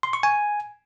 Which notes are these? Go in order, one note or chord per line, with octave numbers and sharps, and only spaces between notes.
C6
C#6
G#5